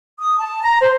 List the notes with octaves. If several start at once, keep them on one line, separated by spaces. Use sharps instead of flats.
D#6
A5
A#5
C5